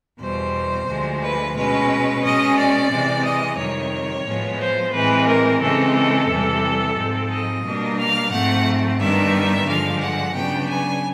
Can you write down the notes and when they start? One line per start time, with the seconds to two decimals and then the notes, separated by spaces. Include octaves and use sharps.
0.21 E2 B2 G3 C5
0.88 D2 D3 F3 G#3
1.22 B4
1.56 B2 G#3 C#4 B4
2.23 B2 G#3 C#4 D#5
2.57 D5
2.91 C3 E3 G#3 C4
3.25 D#5
3.58 F2 C3 D#3 G3 C#5
4.26 A2 F3 G#3 B3
4.60 C5
4.93 A2 E3 G#3 C4 B4
5.28 A#4
5.61 C#3 E3 G#3 C4 A4
5.95 A4
6.29 E2 C3 E3 G3
6.96 G#2 F3 G#3 C4
7.30 D#5
7.63 B2 G3 A#3 D4
7.98 F5
8.31 G#2 F3 A3 C4 F#5
8.99 G2 D#3 G3 B3 D4 E5
9.66 G2 D3 F3 G#3 F5
10.01 F#5
10.34 C#3 F#3 B3 D4 G5
10.68 G#5